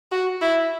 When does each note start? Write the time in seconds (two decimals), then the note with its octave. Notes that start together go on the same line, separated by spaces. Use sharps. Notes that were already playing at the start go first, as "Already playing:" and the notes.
0.12 F#4
0.41 E4